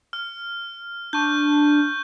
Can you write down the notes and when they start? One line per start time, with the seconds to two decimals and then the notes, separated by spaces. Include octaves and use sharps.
0.13 F6
1.13 D4 C#6 G6